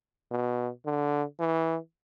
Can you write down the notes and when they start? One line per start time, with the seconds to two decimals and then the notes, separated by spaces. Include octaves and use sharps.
0.31 B2
0.86 D3
1.39 E3